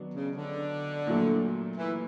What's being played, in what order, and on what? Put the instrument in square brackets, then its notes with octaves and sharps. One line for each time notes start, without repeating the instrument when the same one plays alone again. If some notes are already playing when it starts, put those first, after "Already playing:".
Already playing: [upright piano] D#3 F#3 B3 D4
[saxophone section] C#3
D3
[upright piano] A#2 F#3 A3
[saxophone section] E3